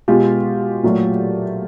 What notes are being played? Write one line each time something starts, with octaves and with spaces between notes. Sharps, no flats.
B2 G#3 F4 G4
A#2 F#3 A3